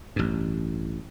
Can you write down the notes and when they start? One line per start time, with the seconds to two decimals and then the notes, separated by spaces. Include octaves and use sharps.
0.16 A1 G2